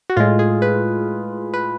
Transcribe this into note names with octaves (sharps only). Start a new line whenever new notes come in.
F#4
A2 G#3 F4
G#4
B4
B4